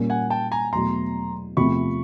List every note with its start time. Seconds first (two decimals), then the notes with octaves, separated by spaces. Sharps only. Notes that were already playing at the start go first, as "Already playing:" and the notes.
Already playing: A#2 G3 A#3 C#4
0.10 F#5 G#5
0.30 G5 A5
0.52 G#5 A#5
0.72 E2 B2 F#3 A3 A#5 C6
1.57 E2 C3 F3 A3 B5 C#6